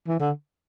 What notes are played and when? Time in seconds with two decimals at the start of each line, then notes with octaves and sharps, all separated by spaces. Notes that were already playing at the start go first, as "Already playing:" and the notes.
0.07 E3
0.20 D3